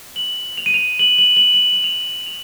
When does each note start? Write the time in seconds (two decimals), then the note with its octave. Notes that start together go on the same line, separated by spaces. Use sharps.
0.16 F#7
0.58 F7
0.66 D#7
0.74 F7
0.99 F#7
1.18 F#7
1.36 F#7
1.54 F#7
1.72 F#7
1.84 F7
2.26 F7